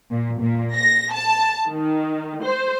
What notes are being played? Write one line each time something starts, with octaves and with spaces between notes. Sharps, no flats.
A#2
A#2
A#6
A5
D#3
C5